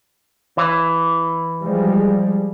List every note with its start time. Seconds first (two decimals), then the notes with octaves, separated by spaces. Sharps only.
0.57 E3
1.60 F3 G3 G#3